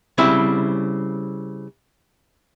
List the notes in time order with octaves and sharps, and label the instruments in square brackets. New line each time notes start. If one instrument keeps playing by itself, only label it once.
[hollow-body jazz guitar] C#3 G3 C4 E4